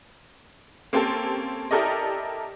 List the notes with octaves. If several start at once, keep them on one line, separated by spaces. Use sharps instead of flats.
A#3 C4 C#4 G4 A4
E4 G4 A4 A#4 D5 D#5